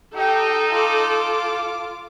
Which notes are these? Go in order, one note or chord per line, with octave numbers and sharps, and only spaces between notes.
D#4 G4 A4 G5
F4 D6